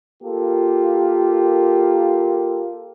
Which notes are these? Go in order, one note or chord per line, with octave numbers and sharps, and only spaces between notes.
A#3 F4 G4 A4 A#4